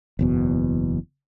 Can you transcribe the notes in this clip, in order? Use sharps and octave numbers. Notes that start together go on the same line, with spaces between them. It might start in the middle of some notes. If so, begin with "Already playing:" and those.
F#1 E2 B2